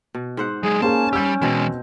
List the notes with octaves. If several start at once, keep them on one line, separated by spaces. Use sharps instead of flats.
B2
G#2 C5 F#5
F#3 G#3 G#4
A#3 C#4 G#4 C5 G#5 A5
G3 G4 E6 G6
B2 E3 G#3 C4